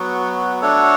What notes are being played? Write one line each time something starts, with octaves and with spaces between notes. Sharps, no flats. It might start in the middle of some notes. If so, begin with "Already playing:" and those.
Already playing: F#3 B3 F#4
A3 D4 F#4 A4 C#5